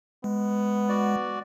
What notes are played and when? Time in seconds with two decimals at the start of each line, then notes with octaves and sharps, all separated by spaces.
0.24 G#3 B3
0.89 F#4 D5